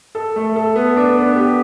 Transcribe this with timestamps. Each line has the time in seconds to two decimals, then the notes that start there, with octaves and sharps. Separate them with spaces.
0.15 A4
0.36 A3
0.56 A4
0.75 B3
0.96 D4
1.17 B3
1.36 G4